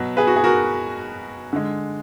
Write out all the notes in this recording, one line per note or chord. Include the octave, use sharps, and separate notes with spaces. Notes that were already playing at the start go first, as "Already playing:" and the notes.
Already playing: B2 F#3
G#4 B4
F#4
G#4
F#4 A#4
D3 G#3